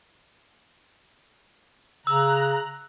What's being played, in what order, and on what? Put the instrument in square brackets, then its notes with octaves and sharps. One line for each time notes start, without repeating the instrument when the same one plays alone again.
[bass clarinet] C#3 [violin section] A#5 F#6 [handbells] E6